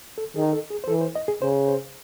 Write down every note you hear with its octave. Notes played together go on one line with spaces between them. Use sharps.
A4
D#3 G#4
A4
G#4
C5
E3 A4
C5
D#5
G#4
C#3 C5
C5